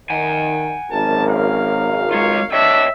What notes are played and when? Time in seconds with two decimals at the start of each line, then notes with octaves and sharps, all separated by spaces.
0.10 D#3 F#5 G#5
0.91 G#1 F#2 A#4 A5
1.29 F5
2.11 G#3 F4 C#5 F5
2.52 D4 C#5 D#5 E5 G5